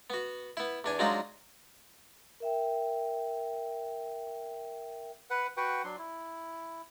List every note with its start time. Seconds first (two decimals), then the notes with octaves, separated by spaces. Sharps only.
0.10 B3 F#4
0.57 B3 E4
0.84 E2 D4 G#5
0.99 F#3 G#3 D4 D#4 F4 F#4
2.40 A#4 E5 G5
5.30 B4 F#5
5.57 F#4 B4 F#5 G5
5.84 F#3 D4 C6
5.99 E4